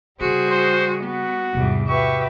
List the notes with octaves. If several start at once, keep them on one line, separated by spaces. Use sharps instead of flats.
C#3 G3 C#4 F#4 G#4 C5
C5
B3 F#4
E2 G#2 C3 G3
F#4 G4 B4 E5 C#6